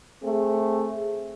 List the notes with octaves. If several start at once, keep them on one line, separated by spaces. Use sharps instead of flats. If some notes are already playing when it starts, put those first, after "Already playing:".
A3 C4 G#4